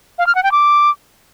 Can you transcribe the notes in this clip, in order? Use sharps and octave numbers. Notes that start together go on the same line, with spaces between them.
F5
F6
F#5
G5
D6